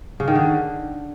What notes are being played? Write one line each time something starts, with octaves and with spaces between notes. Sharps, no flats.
C#3
D#3
D3